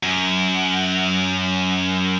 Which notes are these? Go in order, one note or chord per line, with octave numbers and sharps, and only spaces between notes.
F#2